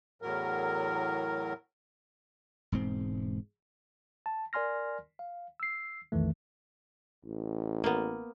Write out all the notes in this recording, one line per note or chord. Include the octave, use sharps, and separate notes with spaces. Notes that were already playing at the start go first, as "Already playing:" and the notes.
E2 A2 F#3 A#4
E1 G#2 C4
A5
A#4 D5 G#5 C6 F6 A#6
F5
E6 C7
B1 F2 D#3 E3 A3
A1
A#3 B3